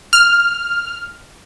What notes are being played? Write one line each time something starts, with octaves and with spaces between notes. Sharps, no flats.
F6